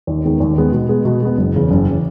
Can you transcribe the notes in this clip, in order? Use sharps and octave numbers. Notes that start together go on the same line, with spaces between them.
D#2
D#3 G#3 B3
D#2
D#3 G#3 B3
B2
G#3 B3
B2
G#3 B3
F#1
E2 C#3 E3
F#1
C#3 E3